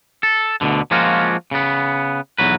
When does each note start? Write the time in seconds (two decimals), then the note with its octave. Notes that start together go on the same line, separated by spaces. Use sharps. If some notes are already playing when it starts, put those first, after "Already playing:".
0.23 A4
0.61 D2 B2 D3
0.91 F3 G#3 A#3 C#4 F4 F#4
1.51 C#3 B3
2.38 B1 E2 F#3 B4